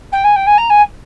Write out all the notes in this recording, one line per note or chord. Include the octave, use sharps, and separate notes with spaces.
G5
G#5
G5
G#5
A#5
G#5